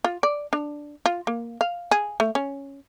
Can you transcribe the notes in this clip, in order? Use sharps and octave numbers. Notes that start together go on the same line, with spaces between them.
F4
D5
D4
F4
A#3
F5
G#4
A3
C#4